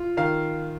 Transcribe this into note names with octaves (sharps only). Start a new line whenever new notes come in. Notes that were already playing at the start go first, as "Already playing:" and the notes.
Already playing: F4
D#3 F5